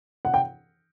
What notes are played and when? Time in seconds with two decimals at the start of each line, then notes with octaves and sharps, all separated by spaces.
0.25 F#5
0.34 G5